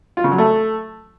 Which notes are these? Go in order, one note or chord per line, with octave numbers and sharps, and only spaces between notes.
F4
C#3
F#3
A3